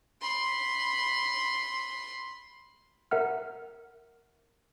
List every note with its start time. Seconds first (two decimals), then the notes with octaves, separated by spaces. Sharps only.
0.21 B5 C6
3.11 A#4 E5 F#5 F6